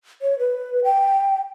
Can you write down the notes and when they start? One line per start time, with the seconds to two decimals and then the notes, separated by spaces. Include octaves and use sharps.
0.22 C#5
0.39 B4
0.84 G5